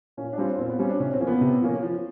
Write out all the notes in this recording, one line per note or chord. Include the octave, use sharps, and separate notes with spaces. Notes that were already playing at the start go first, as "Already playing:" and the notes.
A#2 C#4
D4
G3 C4 C#4 F4
A#2 C4
B3
G3 C4 C#4 F4
D4
C3 C#4
C4
F3 A#3 C#4
B3
C3
F3 A#3 C#4
F3